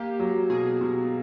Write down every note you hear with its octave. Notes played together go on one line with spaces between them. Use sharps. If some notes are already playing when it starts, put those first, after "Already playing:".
Already playing: A#3 G4
F#3
B2 G#4
B2